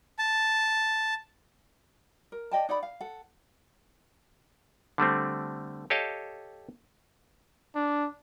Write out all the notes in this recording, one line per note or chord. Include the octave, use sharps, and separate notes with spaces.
A5
A#4
D5 D#5 G5 A5
D#4 D5 F#5 B5
F5
A4 F#5
D3 G3 A3 C4
G4 A4 C#5 D#5 F5 A5
D4